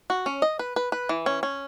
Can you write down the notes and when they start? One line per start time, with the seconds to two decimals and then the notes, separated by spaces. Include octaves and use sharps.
0.10 F#4
0.26 C#4
0.42 D#5
0.59 B4
0.76 B4
0.92 B4
1.09 E3
1.26 C#4
1.43 C#4